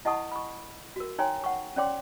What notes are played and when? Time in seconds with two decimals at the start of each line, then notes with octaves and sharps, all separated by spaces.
0.05 E4 D#5 F#5 A5 C#6 D#6
0.32 B5 C#6
0.96 F#4 A#4
1.18 D#4 C#5 G5 G#5 A#5 C6
1.44 F#5 C#6
1.76 C#4 C#5 D5 G5 C6 D6